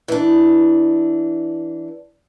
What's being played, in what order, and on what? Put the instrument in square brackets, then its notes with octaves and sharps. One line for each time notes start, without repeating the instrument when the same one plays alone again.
[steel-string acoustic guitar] E3 D4